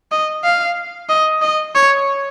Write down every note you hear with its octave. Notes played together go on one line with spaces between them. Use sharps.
D#5
F5
D#5
D#5
C#5